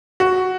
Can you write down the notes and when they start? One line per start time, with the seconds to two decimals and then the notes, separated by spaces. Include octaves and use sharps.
0.20 F#4